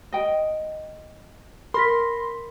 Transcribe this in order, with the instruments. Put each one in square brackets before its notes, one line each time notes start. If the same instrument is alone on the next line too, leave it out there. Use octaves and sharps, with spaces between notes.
[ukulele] D#5 G5
[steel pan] A#4 [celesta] B5 A#6 B6 [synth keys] C6